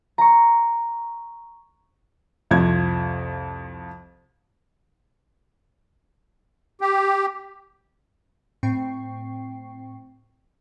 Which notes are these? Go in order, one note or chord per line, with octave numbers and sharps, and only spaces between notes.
A#5 C#6
C2 F2 F3 G#6
G4
A2 C4 G5 C#6 C7